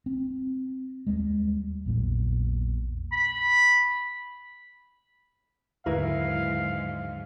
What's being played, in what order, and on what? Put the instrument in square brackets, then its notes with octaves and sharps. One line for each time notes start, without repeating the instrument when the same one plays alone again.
[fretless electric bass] C4
D#2 G3 G#3
A#1 E2 A#2 F#3
[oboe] B5
[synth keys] D#2 D3 [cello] G#2 F#3 [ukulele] E4 A#4 B4 [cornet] F5